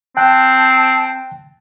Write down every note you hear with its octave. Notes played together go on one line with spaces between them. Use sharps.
C4 G5 A5 F#6